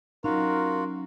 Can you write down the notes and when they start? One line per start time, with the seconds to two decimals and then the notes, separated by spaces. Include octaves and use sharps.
0.24 F#3 C#4 D#4 F4 F#4 A#4